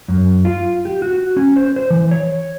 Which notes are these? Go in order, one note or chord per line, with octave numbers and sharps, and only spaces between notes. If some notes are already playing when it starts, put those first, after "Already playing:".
F#2
F4
G4
F#4
C#4
C5
C5
E3
C#5